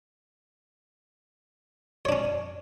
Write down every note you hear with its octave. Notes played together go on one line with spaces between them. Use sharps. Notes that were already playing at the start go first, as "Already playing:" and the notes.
C#4 D4 C#5